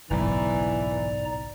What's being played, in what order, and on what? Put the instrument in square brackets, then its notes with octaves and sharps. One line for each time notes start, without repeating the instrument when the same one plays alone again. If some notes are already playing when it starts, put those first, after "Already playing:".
[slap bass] F#1 B1 [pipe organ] G#2 D5 A#5 [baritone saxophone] E3